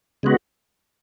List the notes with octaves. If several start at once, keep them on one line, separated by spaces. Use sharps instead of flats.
C#3 G#3 B3 F#4